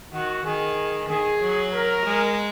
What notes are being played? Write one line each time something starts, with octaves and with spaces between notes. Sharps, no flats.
D#3 F#4
D#3 G#4
D#3 G#4
F#3
A#4
G#3